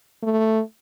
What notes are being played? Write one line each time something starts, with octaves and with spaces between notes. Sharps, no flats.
A3